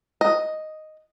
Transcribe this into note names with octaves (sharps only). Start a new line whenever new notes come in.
D#5